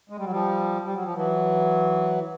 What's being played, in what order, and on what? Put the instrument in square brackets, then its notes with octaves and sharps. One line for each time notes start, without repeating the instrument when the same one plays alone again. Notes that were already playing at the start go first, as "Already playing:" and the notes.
[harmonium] G#3
G3
F#3
F3 G3
G3
F#3
F3
E3 F#3